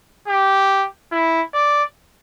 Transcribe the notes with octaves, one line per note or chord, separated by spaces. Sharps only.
G4
E4
D5